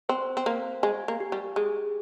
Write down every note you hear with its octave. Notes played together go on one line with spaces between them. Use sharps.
C4 C5
C4
A#3 F5
G#3 G#5
A#3
G4
G3
G#3 G#4